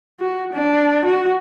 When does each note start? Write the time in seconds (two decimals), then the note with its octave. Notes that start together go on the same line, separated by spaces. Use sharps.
0.20 F#4
0.53 D4
1.05 F#4